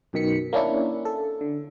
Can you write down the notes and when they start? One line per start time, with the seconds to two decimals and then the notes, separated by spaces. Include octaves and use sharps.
0.13 B1 F#2 B2 D#3 B6 C#7
0.53 A#3 C#4 D4 E4
1.05 A4
1.41 D3